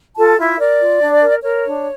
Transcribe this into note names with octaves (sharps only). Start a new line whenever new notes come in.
F4 A4 A5
E4 F4 E5
A#4 D5
F4
D4
A#4
A#4 C#5
D4